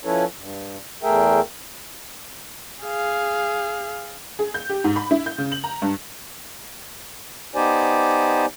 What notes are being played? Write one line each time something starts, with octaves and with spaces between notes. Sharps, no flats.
F3 C#4 E4 A4 B4 C#5
G2
E2 A3 G#4 A#4 E5 G5
G#4 F5
G#4
G6
G4
G#2
B5
E4
G6
C#3
F#7
A#5
G2
B3 D#4 G4 C5 D5 G#5